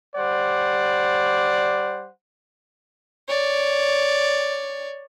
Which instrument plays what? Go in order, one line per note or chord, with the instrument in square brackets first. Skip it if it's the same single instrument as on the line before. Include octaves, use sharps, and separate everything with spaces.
[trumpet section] G3 C5 D5 F#5
[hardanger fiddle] C#5 D5